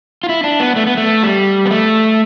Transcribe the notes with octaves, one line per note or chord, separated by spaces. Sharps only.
F4
E4
D4
B3
A3
B3
A3
G3
B3
A3